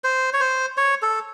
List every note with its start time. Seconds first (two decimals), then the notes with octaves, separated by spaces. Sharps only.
0.04 C5
0.33 C#5
0.40 C5
0.77 C#5
1.02 A4